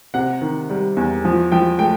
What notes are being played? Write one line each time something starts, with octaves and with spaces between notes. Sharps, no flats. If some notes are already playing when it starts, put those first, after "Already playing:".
C3 F#5
D#3
G3
E2
F3
F3 G5
A3 G5